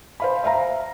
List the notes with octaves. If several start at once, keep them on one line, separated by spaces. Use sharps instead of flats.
C5 F5 B5
E5 F5 A#5